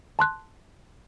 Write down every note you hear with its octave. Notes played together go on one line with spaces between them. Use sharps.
A5 C6 F#6